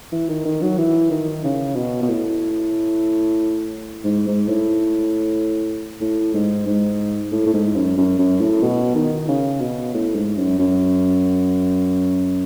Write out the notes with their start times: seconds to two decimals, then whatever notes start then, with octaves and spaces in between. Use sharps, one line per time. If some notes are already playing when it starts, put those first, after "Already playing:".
0.12 E3
0.29 D#3
0.45 D#3
0.62 F#3
0.78 E3
1.11 D#3
1.44 C#3
1.76 B2
2.02 B2
2.09 A2
4.05 G#2
4.27 G#2
4.48 A2
6.01 A2
6.34 G#2
6.67 G#2
7.32 A2
7.46 A2
7.54 G#2
7.75 F#2
7.98 F#2
8.19 F#2
8.41 A2
8.63 B2
8.95 D#3
9.28 C#3
9.61 B2
9.94 A2
10.15 G#2
10.37 F#2
10.59 F#2